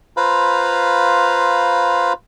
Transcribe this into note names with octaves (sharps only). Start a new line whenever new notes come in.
F4 B4 C5 F5 A#5 B5